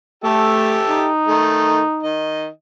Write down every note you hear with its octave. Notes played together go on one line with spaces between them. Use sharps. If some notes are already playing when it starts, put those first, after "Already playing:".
A3 G4 A4 E5
D#4
D#3 A3
D#3 D#5